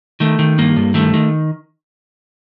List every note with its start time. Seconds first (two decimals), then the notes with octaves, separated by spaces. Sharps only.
0.20 D#3 A3
0.39 D#3
0.58 G2 A#3
0.76 G2
0.94 D#3 A3
1.14 D#3